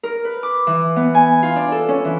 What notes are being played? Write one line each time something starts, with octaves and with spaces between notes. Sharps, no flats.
A#4
B4
D6
E3
B3
G#5
F4
D4
A4
C#4
E3